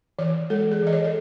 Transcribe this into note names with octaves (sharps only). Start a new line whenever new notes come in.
E3 C#5
G#3 A4
G#4
E3 D#5
C#5
A4